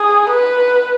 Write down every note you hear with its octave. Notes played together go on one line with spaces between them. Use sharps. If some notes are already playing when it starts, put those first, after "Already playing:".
Already playing: G#4
B4